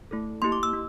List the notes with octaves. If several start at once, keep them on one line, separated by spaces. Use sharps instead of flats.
A3 E4 A4
A#3 E4 G4 C6
D6
E6
A#3